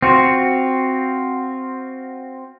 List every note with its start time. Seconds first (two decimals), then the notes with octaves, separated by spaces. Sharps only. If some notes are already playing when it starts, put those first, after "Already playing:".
0.02 C4 F4 F#4